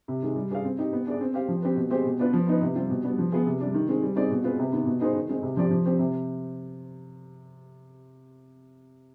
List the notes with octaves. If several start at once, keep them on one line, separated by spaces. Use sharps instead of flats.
C3
D#3 G#3
G3
D4 G#4 D5 F5
C4
D#4 G4
B3
D4 G#4 D5
C4
G4 C5 F5
F3
C4 G4 B4
B2
G#3 C4 G4 C5
B2
B3 D4 F4 B4
F3
B3 D#4 B4
C3
G3 C4 F4
B2
G3 B3 D4
F3
B3 F4 G#4
C3
G3 D4
D#3
G#3 C4
G3
C4 D#4 G#4 D5
B2
G#3 C4 F4 B4
C3
D#3 B3
B2
B3 D#4 G#4 C5
D#3
G#3 C4 D#4
C3
F3 C4 G4 D5
F3
C4 G4 C5
C3